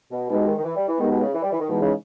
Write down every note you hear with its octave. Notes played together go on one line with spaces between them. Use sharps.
B2
B2 G#3 D#4 G4 B4
D#3
D#3
E3
G3
E3
D#3 G#3 B3 D#4 G4
B2
C#3
E3
G3
E3
D#3
B2 E3 G#3 D#4
C#3